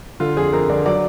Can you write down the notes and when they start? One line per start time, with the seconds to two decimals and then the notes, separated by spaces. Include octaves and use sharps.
0.20 D3 F4
0.37 F2 G#4
0.53 F2 A#4
0.69 D3 D5
0.86 F#3 D5